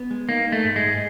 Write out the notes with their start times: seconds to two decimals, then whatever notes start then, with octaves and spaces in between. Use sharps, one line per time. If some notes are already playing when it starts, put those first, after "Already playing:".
Already playing: B3
0.11 G#3
0.29 A#3 D#4
0.47 D#4
0.52 A3
0.64 G#2
0.76 G#3
0.82 G#2